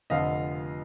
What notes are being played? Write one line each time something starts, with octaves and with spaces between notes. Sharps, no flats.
F1 F2 D3 F3 D#5 F5